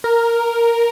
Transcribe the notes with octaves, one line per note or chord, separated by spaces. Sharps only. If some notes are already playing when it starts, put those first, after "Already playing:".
A#4